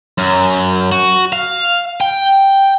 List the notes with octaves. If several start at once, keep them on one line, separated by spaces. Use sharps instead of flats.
F#2
F#4
F5
G5